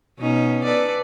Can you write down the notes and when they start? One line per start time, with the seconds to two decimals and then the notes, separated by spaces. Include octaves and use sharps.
0.19 B2 C#4 D#4
0.64 A4 B4 D5